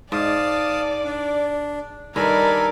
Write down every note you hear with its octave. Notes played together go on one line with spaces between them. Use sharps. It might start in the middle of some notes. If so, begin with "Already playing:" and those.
G#2 D5 F5 A5 D#6
D4
G2 D#3 A4 A#4 D5 G#5 B5